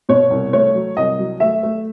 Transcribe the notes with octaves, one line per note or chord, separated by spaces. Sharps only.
B2 C#5
C2
A3 C#5
F#3
C2 D#5
F#3
A3 E5
A3